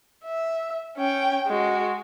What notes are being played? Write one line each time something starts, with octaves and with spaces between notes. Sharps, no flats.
E5
C#4 G5
G#3 F#4